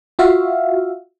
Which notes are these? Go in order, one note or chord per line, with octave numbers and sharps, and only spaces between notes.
F4 F#4 E5 F5